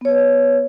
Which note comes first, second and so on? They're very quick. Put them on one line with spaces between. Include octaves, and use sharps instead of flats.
B3 C#5 B4